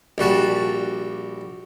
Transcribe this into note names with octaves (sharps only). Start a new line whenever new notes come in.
A#1 G3 F#4 A5